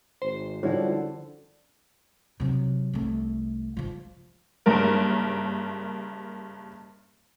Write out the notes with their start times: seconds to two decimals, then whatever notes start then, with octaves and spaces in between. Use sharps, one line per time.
0.22 G#1 C5
0.63 F#2 D3 F3 G3 E4 F#4 C#5
2.40 C3 F#3
2.93 C2 A3
3.77 F3 F4
4.66 F#1 G2 A#4